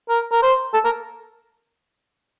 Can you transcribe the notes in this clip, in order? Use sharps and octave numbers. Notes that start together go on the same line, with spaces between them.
A#4
A#4
C5
A4
A#4